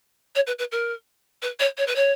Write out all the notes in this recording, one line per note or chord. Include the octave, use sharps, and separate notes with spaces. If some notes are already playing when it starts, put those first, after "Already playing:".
C#5
B4
B4
A#4
B4
C#5
C#5
B4
C#5